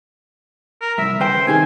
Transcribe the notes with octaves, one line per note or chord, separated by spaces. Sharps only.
A#4
C2 F#2 E5
C#3 B4 C5 G5
C3 D#3 G#4 G#5